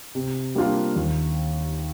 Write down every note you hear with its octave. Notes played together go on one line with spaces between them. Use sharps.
C3
G3 A#3 D4 F4
D#2